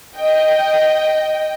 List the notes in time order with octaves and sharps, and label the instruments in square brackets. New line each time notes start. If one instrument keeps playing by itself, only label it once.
[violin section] D#5 G5